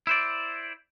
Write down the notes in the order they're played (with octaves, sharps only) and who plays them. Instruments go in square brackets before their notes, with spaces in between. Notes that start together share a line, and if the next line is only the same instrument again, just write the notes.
[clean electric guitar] E4 C5 D5